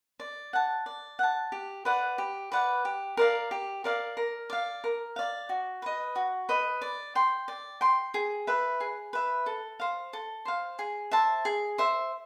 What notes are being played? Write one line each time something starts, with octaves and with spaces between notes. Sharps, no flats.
D5
F#5 A5
D5
F#5 A5
G4
B4 D5 F#5
G4
B4 D5 F#5
G4
A#4 D5 F5
G4
A#4 D5 F5
A#4
D5 F5
A#4
D5 F5
F#4
B4 D#5
F#4
B4 D#5
D5
G5 C6
D5
G5 C6
G#4
B4 E5
G#4
B4 E5
A4
C5 F5
A4
C5 F5
G#4
C5 E5 A5
G#4
C5 E5